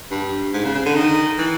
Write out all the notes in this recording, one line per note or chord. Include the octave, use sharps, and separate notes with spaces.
G2
G#2
C#3
C#3
D3
D#3
E3